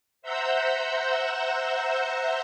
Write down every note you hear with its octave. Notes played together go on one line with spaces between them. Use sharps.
C5 E5 F#5 A#5 E6 G6